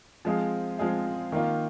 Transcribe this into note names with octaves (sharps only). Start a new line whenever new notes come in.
F3 G#3 C4 F4 G#4
F3 G#3 C4 F4 G#4
D#3 A#3 F4